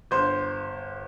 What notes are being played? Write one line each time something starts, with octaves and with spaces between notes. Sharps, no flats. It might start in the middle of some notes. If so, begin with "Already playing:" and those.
G1 C5 C6